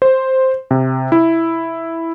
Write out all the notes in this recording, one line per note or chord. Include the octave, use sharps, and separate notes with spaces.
C5
C3
E4